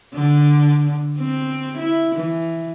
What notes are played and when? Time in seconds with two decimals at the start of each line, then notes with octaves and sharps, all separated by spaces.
0.14 D3
1.18 C4
1.78 E4
2.15 E3